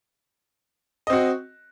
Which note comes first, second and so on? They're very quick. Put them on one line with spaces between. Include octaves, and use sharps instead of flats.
D#5 C4 F#4